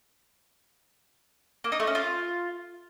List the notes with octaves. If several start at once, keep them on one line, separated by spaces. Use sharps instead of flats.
A#3
D#4
A3
C#4
F4